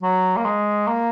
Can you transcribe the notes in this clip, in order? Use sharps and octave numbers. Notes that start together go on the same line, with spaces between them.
F#3
A#3
G#3
A#3